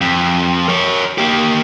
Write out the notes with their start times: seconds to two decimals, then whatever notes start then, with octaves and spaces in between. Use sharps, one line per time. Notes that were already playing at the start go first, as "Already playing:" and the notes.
0.01 F2
0.68 A#4 C#5
1.18 A#3 G4